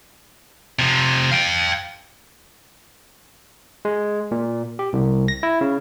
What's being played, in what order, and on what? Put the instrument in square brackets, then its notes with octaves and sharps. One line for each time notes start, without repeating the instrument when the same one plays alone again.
[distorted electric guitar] C3 F3
F5 G5
[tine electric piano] G#3
A#2
G4
C2
A#6
E4
C#3